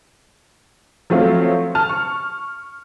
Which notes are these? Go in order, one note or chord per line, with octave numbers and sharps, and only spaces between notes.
F3 F#3 A3 C4 F4
A5 F6
C#6